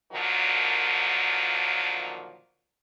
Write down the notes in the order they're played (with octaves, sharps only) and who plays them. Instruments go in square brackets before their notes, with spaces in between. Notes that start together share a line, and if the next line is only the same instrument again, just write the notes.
[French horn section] A#2 D3 D#3 F3 F#3